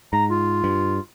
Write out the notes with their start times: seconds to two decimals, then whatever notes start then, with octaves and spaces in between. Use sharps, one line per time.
0.13 G#2 A#5
0.31 F4
0.64 G2